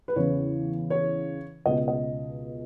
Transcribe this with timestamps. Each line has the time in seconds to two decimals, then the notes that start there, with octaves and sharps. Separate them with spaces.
0.08 B4
0.16 E2 C#3 E3 C#5
0.90 C#5
1.66 C#2 B2 D#5
1.88 D#5